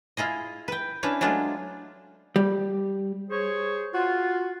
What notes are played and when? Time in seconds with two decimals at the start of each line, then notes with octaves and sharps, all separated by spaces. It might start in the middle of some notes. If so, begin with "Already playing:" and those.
0.17 E4 F4 G#4 D#5
0.68 B4 G5
1.03 C#4 D4 E4 B4 C#5
1.21 F#3 G#3 A3 D4 F4 G#4
2.36 G3
3.30 G#4 C5 C#5
3.94 F4 F#4